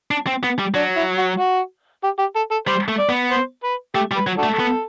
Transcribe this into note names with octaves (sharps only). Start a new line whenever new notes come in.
D4
C4
B3
G3
F#3 D4
E4
F#4
F#4
G4
G4
A4
A4
G3 C5
A3
D5
B3
C5
B4
A3 G4
G3
B4
F#3
D4 F#4 A4
A3
B3